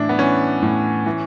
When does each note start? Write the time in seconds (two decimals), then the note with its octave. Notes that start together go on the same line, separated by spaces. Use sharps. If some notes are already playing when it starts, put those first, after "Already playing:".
Already playing: A2 E3 D4 E4
0.09 B3
0.19 E3 C#4
0.63 A2
1.06 E3